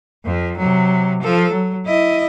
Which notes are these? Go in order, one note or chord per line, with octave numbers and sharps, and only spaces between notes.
F2 F3
C3 F#3
F3 A4
F#3
E4 D#5